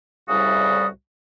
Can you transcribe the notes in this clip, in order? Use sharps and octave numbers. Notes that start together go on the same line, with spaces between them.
C2 A2 C#3 G3 F#4 D#6